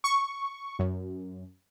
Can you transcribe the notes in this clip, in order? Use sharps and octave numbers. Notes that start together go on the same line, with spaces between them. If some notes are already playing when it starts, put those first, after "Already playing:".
C#6
F#2